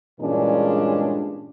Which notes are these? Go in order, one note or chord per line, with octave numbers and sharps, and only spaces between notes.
G2 A#2 E3 G#3 C#4 D4